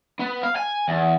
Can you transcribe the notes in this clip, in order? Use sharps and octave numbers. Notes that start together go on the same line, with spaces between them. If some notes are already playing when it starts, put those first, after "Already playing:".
B3
F5
G#5
E2